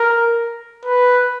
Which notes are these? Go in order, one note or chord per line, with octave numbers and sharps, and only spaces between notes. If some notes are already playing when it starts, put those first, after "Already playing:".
Already playing: A#4
B4